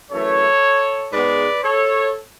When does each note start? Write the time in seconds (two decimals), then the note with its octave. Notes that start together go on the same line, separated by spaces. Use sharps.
0.11 F#2 E3 A3 A4 C#5
1.12 G#2 G#3 B3 B4 D5
1.63 A4 C#5